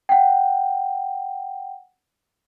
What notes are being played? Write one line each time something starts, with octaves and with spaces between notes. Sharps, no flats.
F#5 G5